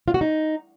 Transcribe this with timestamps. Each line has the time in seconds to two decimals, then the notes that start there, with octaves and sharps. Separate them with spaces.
0.08 F4
0.14 F#4
0.21 D#4